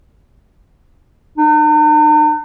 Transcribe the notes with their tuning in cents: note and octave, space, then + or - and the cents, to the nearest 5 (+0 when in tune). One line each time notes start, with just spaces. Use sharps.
D#4 -45